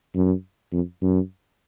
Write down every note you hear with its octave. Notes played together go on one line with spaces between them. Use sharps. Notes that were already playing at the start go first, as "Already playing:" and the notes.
F#2
F2
F#2